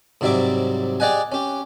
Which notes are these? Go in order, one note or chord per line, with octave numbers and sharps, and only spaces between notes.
G#2 C3 F#3 G3 E5 D6
G4 G#4 D5 D#5 F#5 G#5
C#4 G4